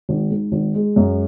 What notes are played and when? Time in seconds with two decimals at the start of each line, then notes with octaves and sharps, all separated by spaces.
0.09 G#1
0.31 G#2
0.52 G#1
0.74 G#3
0.96 F#2